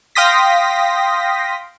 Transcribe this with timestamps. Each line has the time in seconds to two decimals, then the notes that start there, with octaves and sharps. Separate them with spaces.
0.15 F5 G5 C6 D#6 A#6 B6